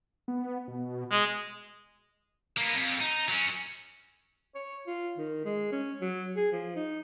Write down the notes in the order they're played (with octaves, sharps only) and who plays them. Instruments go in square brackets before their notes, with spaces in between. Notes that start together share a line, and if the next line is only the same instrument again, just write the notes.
[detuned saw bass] B3
B2
[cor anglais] G#3
[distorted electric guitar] A#3 B3
F2
D#4
F#3 C#4
[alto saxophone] C#5
F4
D#3
G#3
C#4
F#3
G#4
F3
D#4